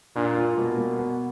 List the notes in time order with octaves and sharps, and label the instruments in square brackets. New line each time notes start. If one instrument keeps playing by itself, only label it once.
[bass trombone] A#2 [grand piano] D4
[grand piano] F4
[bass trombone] B2 [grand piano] A#3
[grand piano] A#3
B3